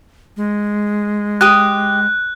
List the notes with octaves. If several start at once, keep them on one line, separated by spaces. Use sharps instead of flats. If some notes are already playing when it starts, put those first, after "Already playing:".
G#3
G4 D#6 F#6